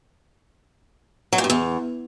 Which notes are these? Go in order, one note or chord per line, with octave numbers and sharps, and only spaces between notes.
F#3
A#2
G2
E2